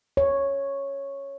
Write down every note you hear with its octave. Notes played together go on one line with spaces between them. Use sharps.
C#5